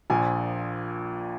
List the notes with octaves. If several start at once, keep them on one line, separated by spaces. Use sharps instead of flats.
A#1 A#2 F3 G#5